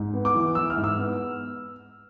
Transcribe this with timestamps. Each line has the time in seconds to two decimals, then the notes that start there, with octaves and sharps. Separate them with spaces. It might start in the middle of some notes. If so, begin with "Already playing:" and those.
Already playing: G#2
0.13 B3
0.25 D6
0.34 E3
0.55 E4 E6
0.70 F6
0.77 G#2
0.84 E6
0.98 B3